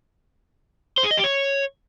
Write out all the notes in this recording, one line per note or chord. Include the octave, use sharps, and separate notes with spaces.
C5
G#4
D#5
G4
C#5